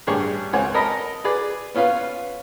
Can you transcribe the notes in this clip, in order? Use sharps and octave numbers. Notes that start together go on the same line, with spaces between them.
A1 G2 G3 C#4 G#4 C#6
C#2 C4 C#5 F#5 G#5
A4 A#4 D#5 A5 B5
G#4 B4 D5
B3 C#4 F4 B4 F5